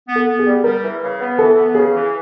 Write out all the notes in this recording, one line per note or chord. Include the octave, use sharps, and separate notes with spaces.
B3
A4
B3
G#4
G3
G3 A#4
E3
C#3
B3
E3 A4
B3
C#3 G#4
E3